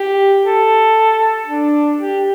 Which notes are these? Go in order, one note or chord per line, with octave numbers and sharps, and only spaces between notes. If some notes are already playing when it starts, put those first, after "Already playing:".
Already playing: G4
A4
D4
G4